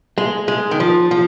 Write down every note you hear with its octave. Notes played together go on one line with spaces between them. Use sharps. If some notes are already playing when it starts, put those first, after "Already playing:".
G#3
G#3
D#3
F3
F3